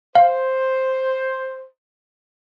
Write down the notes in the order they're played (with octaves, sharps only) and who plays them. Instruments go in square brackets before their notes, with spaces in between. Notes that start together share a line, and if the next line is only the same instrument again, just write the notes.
[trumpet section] C5 [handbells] F5